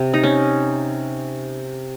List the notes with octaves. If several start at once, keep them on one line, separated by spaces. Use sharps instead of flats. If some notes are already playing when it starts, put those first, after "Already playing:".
Already playing: C3
D#4
C#4